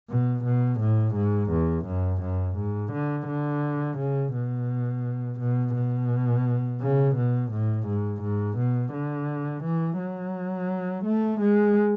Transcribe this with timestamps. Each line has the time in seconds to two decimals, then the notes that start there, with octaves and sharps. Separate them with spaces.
0.09 B2
0.45 B2
0.80 A2
1.15 G#2
1.51 E2
1.86 F#2
2.22 F#2
2.57 G#2
2.93 D3
3.27 D3
3.98 C#3
4.34 B2
5.40 B2
5.75 B2
6.81 C#3
7.16 B2
7.52 A2
7.87 G#2
8.23 G#2
8.58 B2
8.93 D3
9.64 E3
9.99 F#3
11.05 A3
11.41 G#3